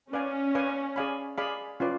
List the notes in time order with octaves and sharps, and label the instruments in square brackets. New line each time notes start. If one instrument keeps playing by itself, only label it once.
[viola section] C#4 [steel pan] B4 D5 F5 G#5
[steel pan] B4 D5 F5 G#5
G#4 D5 F5 G#5 B5
G#4 D5 F5 G#5 B5
C#4 F4 B4 D5